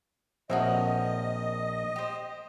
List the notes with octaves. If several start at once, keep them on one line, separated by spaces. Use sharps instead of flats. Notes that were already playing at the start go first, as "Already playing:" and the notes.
A#1 C4 F#4 A#4 C#5 D#5 E5
G4 C5